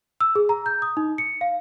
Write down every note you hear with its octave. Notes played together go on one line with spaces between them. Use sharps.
E6
G#4
A#5
G6
D#6
D#4
C#7
F5